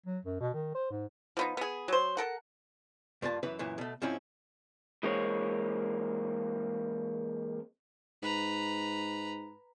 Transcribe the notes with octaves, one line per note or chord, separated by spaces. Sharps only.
F#3
F#2
B2
D#3
C5
G#2
F3 B3 D#4
B3 G#4
F#3 C5
A4 A#4 F#5
G2 A#3 F4 A#4 A5
F#2 E3 B4 E5 B5
F#2 A#2 E3
B2 A3
G#2 F3 C4 C#4 E4
E3 G#3 A#3 C4 C#5
G#2 B4 A#5